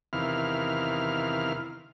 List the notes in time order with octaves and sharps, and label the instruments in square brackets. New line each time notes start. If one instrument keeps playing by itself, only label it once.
[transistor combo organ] E2 C3 D#3 E4 F5 F6